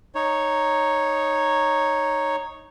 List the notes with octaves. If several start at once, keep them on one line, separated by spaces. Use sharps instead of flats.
D#4 C#5